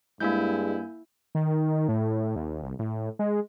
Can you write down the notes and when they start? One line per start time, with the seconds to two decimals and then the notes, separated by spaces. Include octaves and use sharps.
0.20 G2 G#3 A#3 E4 G#5 G6
1.35 D#3
1.88 A2
2.36 D#2
2.63 C2
2.79 A2
3.19 G#3